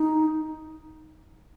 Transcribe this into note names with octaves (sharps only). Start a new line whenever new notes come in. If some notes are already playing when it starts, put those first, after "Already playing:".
Already playing: D#4